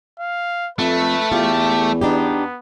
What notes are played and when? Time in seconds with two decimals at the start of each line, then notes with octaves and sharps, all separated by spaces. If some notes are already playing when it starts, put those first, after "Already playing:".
0.19 F5
0.79 F2 A3 A4 B4
1.32 E2 F4 G4
2.01 B3 D4 D#4 G4